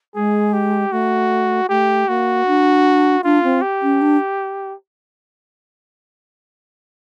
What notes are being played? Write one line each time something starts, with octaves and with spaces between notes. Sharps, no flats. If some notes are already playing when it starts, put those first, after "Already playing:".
G#3 G#4
G4
A3 F#4
A3 G4
A#3 F#4
D4
D4 F4
C4
G4
C#4
D4